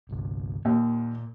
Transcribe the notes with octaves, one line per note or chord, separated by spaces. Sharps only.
G1 C2
D#2 A#2